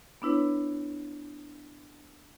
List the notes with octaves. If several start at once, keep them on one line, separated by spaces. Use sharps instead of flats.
B3 D4 E4 B4 C#5